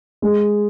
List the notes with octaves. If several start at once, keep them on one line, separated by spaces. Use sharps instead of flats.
G#3